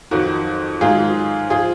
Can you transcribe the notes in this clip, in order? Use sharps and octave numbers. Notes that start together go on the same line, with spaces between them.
F2 D#3 F#3 F#4
G#2 D#3 F#3 F4 G#4
F3 F4 G#4